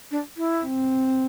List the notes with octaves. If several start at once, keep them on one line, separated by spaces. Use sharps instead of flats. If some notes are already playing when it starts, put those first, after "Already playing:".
D4
E4
C4